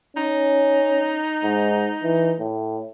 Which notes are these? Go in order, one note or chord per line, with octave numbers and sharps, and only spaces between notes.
C#4 D#4
G#2
E3
A2